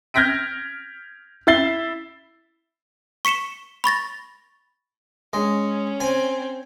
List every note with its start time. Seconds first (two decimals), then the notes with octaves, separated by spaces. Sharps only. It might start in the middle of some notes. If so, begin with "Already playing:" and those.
0.14 F6 G6 G#6 A#6 B6 D7
1.47 E4 E5 A6 C7 G7
3.25 C#6 B6 C#7 E7 G7
3.84 B5 C#6 A6 A#6
5.33 G#3 C#4
6.00 C4 G#5